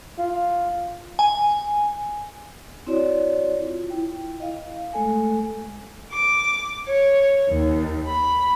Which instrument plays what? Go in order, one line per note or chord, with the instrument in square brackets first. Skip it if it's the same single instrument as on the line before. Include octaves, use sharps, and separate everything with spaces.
[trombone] F4
[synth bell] G#5
[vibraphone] C4 E4 F#4 C#5 D5
F4
E4 G5
D#5 F5
G#3 A3 A4 G#5
[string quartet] D6
C#5
D#2
B5